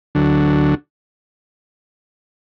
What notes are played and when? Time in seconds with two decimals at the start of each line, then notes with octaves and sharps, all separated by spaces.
0.15 D2 D3 F#3